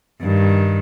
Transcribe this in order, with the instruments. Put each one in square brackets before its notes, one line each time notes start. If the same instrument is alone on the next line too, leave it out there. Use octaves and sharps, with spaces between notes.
[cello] G2 D#3